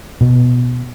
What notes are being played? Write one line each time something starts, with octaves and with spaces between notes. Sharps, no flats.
B2